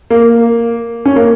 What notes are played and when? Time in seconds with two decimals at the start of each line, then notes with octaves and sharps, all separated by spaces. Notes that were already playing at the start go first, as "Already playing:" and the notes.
0.10 A#3
1.06 C#4
1.16 A#3